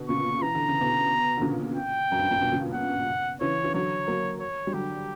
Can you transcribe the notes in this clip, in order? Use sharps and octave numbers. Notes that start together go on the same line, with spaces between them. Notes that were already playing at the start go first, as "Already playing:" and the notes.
Already playing: B2 D3
A#2 C#3 C#6
E3 A#5
D3
C#3
B2 D3
D3
A#2 C#3
G5
F#2
G2
F#2 A#2
G2 B2
A#2 C#3
F#5
C#3 E3 C#5
E3
D3 F#3 C#5
F#3 A#3
C#5
G3
D3 F#3 G4